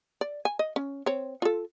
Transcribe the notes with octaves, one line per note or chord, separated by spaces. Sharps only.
D5
G#5
D#5
C#4
C4 C#5
F4 A4